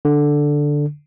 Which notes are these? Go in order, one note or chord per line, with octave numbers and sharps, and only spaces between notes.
D3